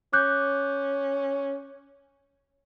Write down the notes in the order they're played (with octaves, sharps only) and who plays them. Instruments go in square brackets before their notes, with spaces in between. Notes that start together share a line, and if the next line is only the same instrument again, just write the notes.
[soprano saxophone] C#4 [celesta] D6 F#6 G6